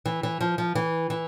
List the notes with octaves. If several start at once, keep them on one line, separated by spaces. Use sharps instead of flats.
E3
E3
F3
F3
E3
E3